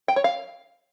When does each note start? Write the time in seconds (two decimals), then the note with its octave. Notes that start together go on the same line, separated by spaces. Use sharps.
0.08 G5
0.16 C#5
0.24 F5